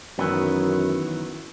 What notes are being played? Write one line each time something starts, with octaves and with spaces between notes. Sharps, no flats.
F#2 D#3 E3 B3